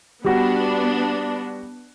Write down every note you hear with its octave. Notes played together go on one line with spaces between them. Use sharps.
G3 B3 D4 F#4